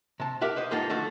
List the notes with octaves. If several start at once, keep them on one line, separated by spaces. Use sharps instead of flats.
C3 A5
G4 A#4 E5 F#5
B4 C5 D#5
G#2 D#3 D#4 F4 A4 F#5
D3 F3 A3 F#4 A4